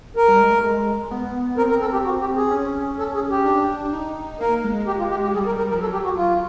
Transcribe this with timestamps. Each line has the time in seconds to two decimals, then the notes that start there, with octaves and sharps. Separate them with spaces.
0.16 A#4
0.28 G3
0.40 G#3
0.52 A3
0.64 G#3
1.11 B3
1.57 C4 A#4
1.70 A#4
1.81 A4
1.93 G4
2.05 F#4
2.20 G4
2.36 G#4
2.51 C#4
2.99 C#4 A4
3.15 G#4
3.30 G4
3.45 D4
3.85 D4
3.93 D#4
4.40 A#3 A#4
4.64 G#3
4.87 G4
4.98 F4
5.11 G4
5.22 G4
5.34 G3 G#4
5.46 A#4
5.58 A#4
5.69 F3 A#4
5.81 F#3 A4
5.93 G4
6.04 F#4
6.16 F4
6.28 F#3